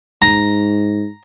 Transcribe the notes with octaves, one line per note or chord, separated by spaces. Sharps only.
G#2 A#5